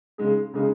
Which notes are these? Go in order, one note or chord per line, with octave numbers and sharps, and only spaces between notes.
C#3 G#3 D#4 G#4
C#3 G#3 D#4 G#4